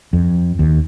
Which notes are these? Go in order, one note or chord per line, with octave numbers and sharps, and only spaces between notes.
F2
D#2